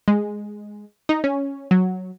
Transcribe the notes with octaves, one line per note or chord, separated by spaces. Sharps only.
G#3
D#4
C#4
F#3